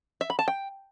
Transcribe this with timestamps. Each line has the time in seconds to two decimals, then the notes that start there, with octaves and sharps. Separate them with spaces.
0.21 E5
0.30 B5
0.39 A5
0.48 G5